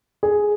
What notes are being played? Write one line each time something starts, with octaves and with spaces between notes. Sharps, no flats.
G#4